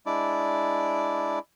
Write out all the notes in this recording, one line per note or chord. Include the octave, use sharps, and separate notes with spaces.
G#3 D4 E4 D5